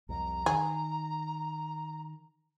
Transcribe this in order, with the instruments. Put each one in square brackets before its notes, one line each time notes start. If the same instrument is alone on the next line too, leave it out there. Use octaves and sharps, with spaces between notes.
[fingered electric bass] C2 F2 C3 [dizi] A#5
[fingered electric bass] D#3 [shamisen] G#4